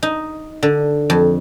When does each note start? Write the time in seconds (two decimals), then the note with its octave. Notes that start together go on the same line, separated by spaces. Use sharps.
0.03 D#4
0.63 D3
1.10 F2